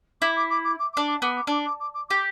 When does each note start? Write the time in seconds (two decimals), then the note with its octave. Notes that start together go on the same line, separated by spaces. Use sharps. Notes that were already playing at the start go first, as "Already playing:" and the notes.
0.21 E4 D6
0.36 D6
0.50 D6
0.64 D6
0.79 D6
0.93 D6
0.97 D4
1.07 D6
1.22 B3 D6
1.36 D6
1.47 D4 D6
1.65 D6
1.80 D6
1.94 D6
2.09 G4 D6